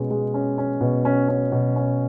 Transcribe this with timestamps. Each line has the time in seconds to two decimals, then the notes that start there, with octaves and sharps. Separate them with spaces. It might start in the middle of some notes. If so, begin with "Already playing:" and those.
Already playing: B2 G#3 C#4
0.10 G#3
0.34 C#4
0.58 C#4
0.81 B2
1.05 C#4
1.29 C#4
1.52 B2
1.76 C#4